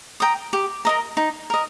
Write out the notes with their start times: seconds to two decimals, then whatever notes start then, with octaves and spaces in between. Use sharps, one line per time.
0.20 G5 A#5 D#6
0.53 G4
0.85 A#4 D#5 A#5
1.17 D#4
1.50 A#4 D#5